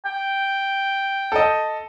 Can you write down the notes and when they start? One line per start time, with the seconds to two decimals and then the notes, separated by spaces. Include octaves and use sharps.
0.05 G5
1.32 A4 D#5